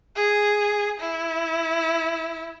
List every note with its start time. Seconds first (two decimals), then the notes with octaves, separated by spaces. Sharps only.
0.16 G#4
1.00 E4